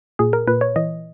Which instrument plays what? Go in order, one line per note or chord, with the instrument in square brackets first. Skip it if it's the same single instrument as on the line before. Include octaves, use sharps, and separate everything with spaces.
[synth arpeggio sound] A#2 G#4
A#4
A#2 B4
C#5
E3 D#5